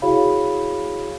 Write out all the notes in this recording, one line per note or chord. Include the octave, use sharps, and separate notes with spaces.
E4 F#4 G#4 C#5 F5 B5